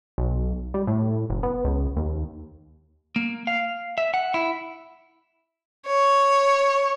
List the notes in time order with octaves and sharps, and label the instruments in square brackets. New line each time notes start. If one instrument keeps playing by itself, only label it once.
[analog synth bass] B1
G3
A2
F#1
B3
C#2
D#2
[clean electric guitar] A#3
F5
E5
F#5
E4
[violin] C#5